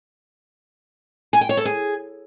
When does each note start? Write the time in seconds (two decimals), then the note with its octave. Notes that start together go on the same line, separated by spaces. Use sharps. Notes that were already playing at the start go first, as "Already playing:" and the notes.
1.33 G#5
1.41 G5
1.49 C#5
1.57 A4
1.65 G#4